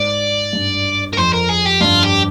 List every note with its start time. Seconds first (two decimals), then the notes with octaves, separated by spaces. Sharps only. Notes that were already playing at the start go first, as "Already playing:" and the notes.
Already playing: G#2 D5
0.53 G2
1.13 A#4
1.17 F2 C5
1.33 A#4
1.49 G#4
1.65 G4
1.81 G2 F4
2.03 G4